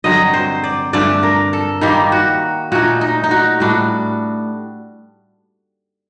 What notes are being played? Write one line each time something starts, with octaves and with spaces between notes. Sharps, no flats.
G2 D3 F#3 C4 D#5
C5
D5
G2 D3 A3 D4 D5
A#4
A4
D#3 G3 A#3 D#4 G4
F#4
A#2 A3 D#4 F#4
D#4
D#4
F#4
A2 G3 D4 F#4